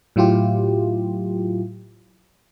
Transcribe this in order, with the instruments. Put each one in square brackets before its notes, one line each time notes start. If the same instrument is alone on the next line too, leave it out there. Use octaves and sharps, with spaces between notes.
[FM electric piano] A2 F#3 E4 F4 G4